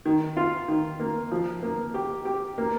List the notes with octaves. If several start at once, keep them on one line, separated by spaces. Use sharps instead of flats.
D#3
F4
D#3
A#3
F3
A#3
G4
G4
A#3